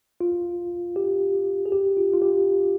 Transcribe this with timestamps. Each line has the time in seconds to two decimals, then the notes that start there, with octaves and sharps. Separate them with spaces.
0.21 F4
0.96 G4
1.66 G#4
1.72 G4
1.97 F4
2.13 F4
2.22 G4